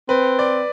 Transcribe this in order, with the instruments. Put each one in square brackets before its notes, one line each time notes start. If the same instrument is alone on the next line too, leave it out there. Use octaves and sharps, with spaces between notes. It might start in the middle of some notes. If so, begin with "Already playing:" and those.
[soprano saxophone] C4 [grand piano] B4
[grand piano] D5